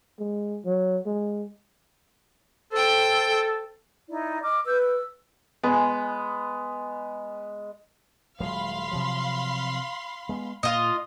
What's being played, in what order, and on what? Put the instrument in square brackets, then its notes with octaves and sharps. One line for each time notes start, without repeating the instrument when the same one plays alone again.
[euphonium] G#3
F#3
G#3
[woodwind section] A4 [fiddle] C5 G5
[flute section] D#4 E4 D5
D#5 D6 F6
[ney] B4 [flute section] E6 G6
[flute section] E6
[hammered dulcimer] G#3 [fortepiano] B3
[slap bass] D#1 F#3 G#3 [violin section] F5 B5 C6
[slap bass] C3 F3 F#3
G#3 B3
[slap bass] A#2 A#3 [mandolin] F4 D#5